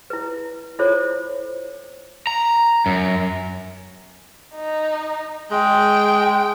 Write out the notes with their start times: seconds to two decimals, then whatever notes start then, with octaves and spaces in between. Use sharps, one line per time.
0.10 E4 B4
0.79 E4 F4 A4 C5 C#5
2.27 A#5
2.86 F#2
4.54 D#4
5.51 G#3 G5